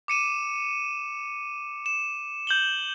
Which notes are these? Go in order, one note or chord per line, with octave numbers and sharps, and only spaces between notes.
D6 C#7 D#7 E7
E7
G6 F#7 G7